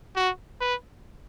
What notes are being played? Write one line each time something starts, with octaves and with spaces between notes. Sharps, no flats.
F#4
B4